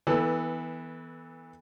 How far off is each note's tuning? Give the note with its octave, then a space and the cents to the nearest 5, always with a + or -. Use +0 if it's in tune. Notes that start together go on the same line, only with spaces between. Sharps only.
E3 -20 B3 +0 A4 +0